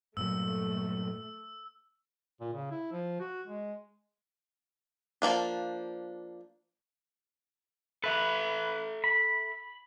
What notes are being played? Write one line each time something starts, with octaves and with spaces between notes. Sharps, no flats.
G2 A#2 F#3 A3 E6
A#2
C#3
E4
F3
F#4
G#3
F3 G#3 A#3 D4
A4 B4 E5 A#5
B5